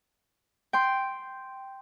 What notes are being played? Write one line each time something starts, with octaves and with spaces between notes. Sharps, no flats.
G5 C6